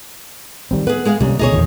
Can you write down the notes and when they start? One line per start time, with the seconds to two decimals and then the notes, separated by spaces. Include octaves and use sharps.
0.71 D#3 G3 C4
0.87 B3 G#4 B4
1.05 G#3 G#4 F5
1.21 D#2 C3 G3 C#4
1.39 D2 B2 A3 D#4 G#4 C#5
1.52 E2 A#2 D#3